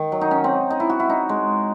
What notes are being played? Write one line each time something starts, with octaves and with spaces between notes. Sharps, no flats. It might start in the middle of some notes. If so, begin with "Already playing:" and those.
Already playing: D#3
F#3
D#4
C#4
C4
D#4
E4
F#4
E4
D#4
G#3